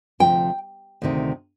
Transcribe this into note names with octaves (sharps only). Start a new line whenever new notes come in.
D2 C3 F3 G5
D2 C3 D#3